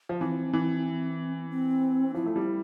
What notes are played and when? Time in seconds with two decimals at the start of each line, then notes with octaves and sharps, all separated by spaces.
0.09 F3
0.20 E3 C4
0.53 E3
1.50 C4
2.14 F3 E4
2.26 A3
2.36 G3